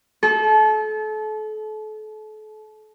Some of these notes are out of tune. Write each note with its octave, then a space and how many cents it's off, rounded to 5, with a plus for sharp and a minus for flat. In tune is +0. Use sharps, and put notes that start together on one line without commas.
A4 -35